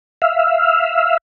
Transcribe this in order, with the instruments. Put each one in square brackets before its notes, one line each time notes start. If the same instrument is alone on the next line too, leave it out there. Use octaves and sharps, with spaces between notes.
[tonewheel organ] E5 F5